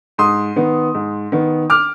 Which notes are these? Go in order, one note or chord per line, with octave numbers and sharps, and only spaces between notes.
G#2 C6 D#6
D#3 B3
G#2
D#3 B3
D6 F6